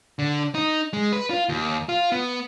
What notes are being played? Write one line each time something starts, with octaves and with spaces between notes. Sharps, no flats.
D3
D#4
G#3
B4
F4
D#2
F4
B3